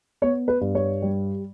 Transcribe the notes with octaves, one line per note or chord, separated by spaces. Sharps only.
B3 C#5
B4
G2
C#5
G3